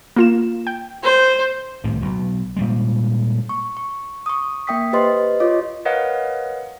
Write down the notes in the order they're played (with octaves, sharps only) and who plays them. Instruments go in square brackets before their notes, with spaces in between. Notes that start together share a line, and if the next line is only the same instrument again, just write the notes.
[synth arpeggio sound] A#3 F4 E7
G5
[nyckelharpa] C5
[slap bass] C2 A2 C3 D#3
B1 B2
A#2 G3 G#3
[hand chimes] C#6
C#6
C#6 D#6
A#3 E5 G5 D#6 B6
G4 B4 C5 D#5 C6
F4 C#5 D#5 D6
[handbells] A#4 B4 C#5 D#5 F5 F#5